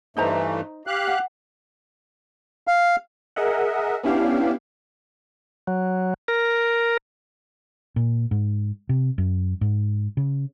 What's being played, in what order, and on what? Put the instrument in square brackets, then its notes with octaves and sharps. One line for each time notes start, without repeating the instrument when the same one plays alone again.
[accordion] G2 E3 A3 [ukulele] D#4 C5 A#5
[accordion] G4 F5 F#6
[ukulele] F#5
[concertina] F5
[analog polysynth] G#4 A#4 D#5 E5 F#5
B3 C#4 D4 E4 G4 F5
[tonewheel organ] F#3
A#4
[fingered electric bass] A#2
G#2
C3
F#2
G#2
C#3